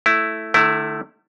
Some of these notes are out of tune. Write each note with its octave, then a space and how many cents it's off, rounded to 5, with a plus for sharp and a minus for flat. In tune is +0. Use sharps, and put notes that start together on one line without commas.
A3 +0 E4 +0
D3 +45 A3 +0 E4 +0